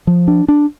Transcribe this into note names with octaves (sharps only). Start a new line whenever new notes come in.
F3
D4
D4